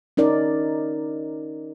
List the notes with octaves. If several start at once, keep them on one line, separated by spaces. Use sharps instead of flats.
C#4 D#4 A#4 D5